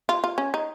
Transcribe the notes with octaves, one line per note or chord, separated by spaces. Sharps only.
F4
F4
C#4
D#4